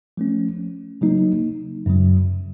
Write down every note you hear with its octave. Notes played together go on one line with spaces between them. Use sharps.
F3 A3 C#4
C#3 F#3 A#3 D#4
F#2 C#3 F#3